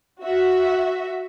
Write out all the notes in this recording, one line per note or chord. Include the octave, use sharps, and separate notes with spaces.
F#4 E5